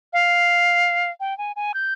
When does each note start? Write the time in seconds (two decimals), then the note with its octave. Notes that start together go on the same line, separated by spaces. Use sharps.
0.13 F5
1.20 G5
1.38 G#5
1.56 G#5
1.74 G6